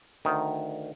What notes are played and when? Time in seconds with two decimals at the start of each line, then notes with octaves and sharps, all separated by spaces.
0.25 D2 D#3